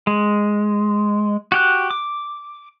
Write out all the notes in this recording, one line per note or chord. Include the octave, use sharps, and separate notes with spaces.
G#3
F#4 G4 F#6
D6